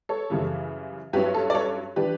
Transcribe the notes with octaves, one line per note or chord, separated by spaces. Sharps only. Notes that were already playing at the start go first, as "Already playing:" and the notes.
A4 C#5
F#2 C#3 E3 G3
G2 F#3 C#4 E4 G4 B4
A4
D5
A4 C#5
E3 G3 D4 G4 B4